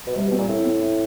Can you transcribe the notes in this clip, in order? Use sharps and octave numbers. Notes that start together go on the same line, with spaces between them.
B2
C3 G3
B2
C4
A#2
A2 E4
C4
E4